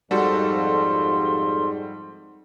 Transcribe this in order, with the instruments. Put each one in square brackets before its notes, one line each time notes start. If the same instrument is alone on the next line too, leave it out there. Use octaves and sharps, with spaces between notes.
[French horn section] F2 [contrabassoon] G#2 [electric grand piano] G3 F#4 A4 [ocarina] C6